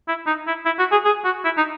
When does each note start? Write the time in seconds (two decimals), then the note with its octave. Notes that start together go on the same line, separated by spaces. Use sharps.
0.08 E4
0.27 D#4
0.47 E4
0.66 E4
0.79 F#4
0.92 G#4
1.05 G#4
1.25 F#4
1.45 E4
1.57 D#4